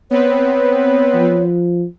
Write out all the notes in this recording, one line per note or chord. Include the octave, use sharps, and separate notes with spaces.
B3 C4 B4 C#5
F3